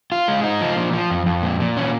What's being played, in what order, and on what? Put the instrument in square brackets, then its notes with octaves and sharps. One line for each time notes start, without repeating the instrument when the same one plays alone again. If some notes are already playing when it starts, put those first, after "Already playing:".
[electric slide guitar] F4
G#3
D#4
F3
A#2
F3
F2
F2
A#2
A#2
C#4